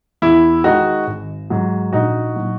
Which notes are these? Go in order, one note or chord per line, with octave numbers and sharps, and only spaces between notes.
E2 E4
D#3 G#3 D#4 F#4
G#1
G#2 F#3
A#1 D#4 F#4
A#2 F#3